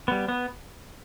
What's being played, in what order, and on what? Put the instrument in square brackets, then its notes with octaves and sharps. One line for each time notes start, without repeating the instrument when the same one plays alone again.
[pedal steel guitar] G3 B3
B3